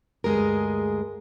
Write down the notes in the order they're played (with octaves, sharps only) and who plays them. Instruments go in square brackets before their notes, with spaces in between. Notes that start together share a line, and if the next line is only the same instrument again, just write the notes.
[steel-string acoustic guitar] D2 G2 G#3 G#4 A#4